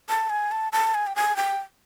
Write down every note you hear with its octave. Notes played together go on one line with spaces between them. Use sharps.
A5
G#5
A5
A5
G#5
G5
G#5
G5